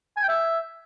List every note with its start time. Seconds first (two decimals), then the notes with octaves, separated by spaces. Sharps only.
0.17 G#5
0.23 G5
0.29 E5